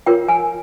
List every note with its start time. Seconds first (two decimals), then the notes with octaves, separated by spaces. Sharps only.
0.06 F4 A#4 C#5 G5
0.28 G#5